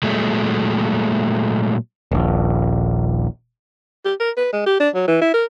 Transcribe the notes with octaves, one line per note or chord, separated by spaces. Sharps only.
A#2 F#3 G#3 A3
D#1 A#1
G4
A#4
B4
G#3
G4
D4
F#3
E3
E4
A#4